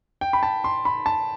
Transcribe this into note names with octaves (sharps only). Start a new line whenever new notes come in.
G5
B5
A5
C6
B5
A5